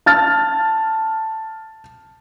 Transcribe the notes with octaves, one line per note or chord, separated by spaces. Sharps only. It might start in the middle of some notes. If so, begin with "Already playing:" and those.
A5 F6 A6